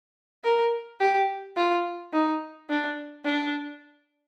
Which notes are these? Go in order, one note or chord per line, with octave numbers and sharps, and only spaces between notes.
A#4
G4
F4
D#4
D4
D4